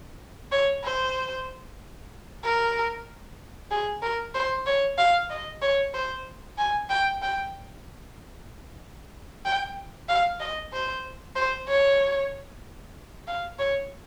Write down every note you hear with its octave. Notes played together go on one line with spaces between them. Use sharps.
C#5
C5
A#4
G#4
A#4
C5
C#5
F5
D#5
C#5
C5
G#5
G5
G5
G5
F5
D#5
C5
C5
C#5
F5
C#5